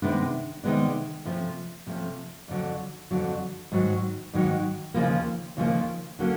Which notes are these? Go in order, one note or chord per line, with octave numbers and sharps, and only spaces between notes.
C3 D#3 G#3 B3 D4
C3 D#3 G#3 B3 D4
C3 F3 A3 C#4
C3 F3 A3 C#4
F2 D3 F#3
F2 D3 F#3
G#2 D#3 F#3
G#2 D#3 F#3
D#2 C#3 F3 A#3
D#2 C#3 F3 A#3
D3 F#3 A#3 C#4